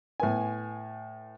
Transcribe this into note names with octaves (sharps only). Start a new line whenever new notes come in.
A2 B3 G#5